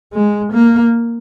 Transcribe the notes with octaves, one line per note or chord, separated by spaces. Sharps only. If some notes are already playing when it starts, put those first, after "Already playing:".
G#3
A#3